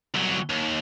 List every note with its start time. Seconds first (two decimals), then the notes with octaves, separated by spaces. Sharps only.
0.14 C2 F#3
0.49 D#2